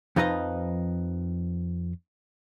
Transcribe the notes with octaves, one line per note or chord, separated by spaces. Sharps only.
F2 F3 D#4 B4 D#5 F5